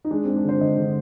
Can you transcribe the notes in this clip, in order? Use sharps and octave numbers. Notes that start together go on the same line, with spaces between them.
D#4
G#3 D4
G#3 C4
D4
D3 C5
D3 D#5
D3